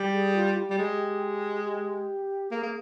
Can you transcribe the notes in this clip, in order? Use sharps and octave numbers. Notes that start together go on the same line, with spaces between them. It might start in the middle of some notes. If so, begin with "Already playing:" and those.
Already playing: G3
G#4
F4
G4
G3
G#3
G4
A#3 G#4
A#3